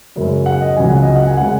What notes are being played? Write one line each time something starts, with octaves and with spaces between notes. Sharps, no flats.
F#2 C#3 G#3
F#5
D#5
C#2 C#3 F#3 G#5
F#5
D#5
F#5
G#5
C#3 G#3 F#5